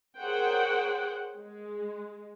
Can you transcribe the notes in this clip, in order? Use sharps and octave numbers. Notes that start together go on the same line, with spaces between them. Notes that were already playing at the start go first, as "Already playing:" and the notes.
G#4 A#4 C5 C#5 F#5 G5
G#3